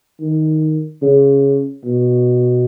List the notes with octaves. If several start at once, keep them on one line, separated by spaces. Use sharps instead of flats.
D#3
C#3
B2